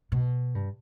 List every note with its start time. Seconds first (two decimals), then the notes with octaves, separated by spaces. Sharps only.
0.12 B2
0.55 G2